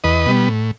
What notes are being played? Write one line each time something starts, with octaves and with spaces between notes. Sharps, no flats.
E2 B4 D#5
B2 G3 B3
A2